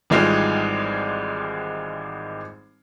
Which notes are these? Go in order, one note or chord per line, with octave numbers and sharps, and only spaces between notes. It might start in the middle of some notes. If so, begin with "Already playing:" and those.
G#1 E3 G3 G#3 D#4 F4